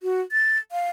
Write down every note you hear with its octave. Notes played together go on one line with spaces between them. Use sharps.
F#4
A6
F5